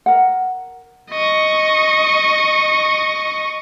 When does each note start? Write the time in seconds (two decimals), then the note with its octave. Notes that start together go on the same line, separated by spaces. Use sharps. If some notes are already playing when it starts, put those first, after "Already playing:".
0.06 A#4 F#5
1.11 D#5 C#6